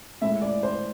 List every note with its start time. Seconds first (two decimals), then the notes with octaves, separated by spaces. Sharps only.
0.21 A2 G#3 E5
0.42 D5
0.63 C5